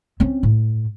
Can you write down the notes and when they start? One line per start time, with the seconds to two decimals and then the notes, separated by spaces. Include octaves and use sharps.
0.20 C4 C#4
0.43 A2